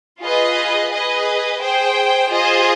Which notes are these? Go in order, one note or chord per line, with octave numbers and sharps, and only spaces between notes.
F4 G#4 B4 D#5
G#4 B4 D#5
G#4 C5 G5
F4 G#4 C5 D#5